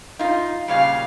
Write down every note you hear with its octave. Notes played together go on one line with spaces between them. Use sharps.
D#4 F4
A#2 C#3 G3 F5